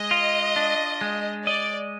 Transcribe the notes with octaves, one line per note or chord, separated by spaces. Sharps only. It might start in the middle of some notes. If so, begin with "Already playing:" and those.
Already playing: G#3 D#5
F4
D4
G#3
D5 D#5